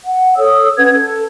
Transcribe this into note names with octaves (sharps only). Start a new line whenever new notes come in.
F#5
A4 C#5 D#6 E6
C#4 B4 F#5 G#6
A4